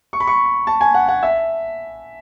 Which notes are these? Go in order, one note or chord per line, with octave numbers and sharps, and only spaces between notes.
C#6
B5
C#6
A5
G#5
F#5
F#5
E5